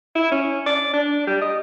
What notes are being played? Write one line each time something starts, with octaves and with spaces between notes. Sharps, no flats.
E4
C#4
D5
D4
G3
D#5